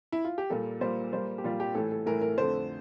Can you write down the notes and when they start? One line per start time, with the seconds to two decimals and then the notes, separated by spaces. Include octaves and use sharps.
0.12 E4
0.25 F4
0.38 G4
0.50 A#2 G3 A#3 A4
0.81 A#2 G3 A#3 C5
1.13 A#2 G3 A#3 C5
1.38 G4
1.44 A#2 G3 A#3 F4
1.60 G4
1.75 A2 E3 A3 A4
1.91 A4
2.06 A2 E3 A3 A#4
2.21 A#4
2.37 F2 D3 A3 C5